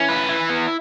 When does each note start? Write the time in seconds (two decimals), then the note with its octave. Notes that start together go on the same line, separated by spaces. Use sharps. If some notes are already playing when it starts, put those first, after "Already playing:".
Already playing: E3 C#4
0.09 B4
0.29 E4
0.50 B3